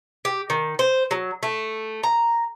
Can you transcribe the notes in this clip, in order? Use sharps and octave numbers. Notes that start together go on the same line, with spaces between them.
G4
D#3
C5
F#3
A3
A#5